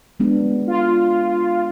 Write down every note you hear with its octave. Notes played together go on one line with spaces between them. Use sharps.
G#3 B3 D4
F4